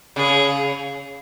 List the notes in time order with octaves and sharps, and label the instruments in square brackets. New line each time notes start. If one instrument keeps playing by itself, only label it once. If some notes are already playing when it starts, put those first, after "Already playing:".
[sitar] C#3 [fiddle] G#4